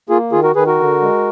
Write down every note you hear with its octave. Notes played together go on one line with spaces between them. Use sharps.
A#3 F4 G#4
D#3 F4 G#4
F#4 A#4
D#3 G#4 B4
F#4 A#4
D3
G#3